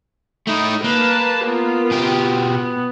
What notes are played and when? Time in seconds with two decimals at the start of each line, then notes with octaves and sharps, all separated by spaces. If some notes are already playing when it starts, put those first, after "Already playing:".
0.47 A3 D#4 E4
0.84 A#3 B4 A5
1.45 B3 F4
1.92 B2 G4
2.49 B3